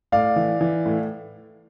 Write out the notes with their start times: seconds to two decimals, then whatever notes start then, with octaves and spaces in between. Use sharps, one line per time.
0.12 A2 D5 F5
0.36 E3
0.61 E3
0.86 A2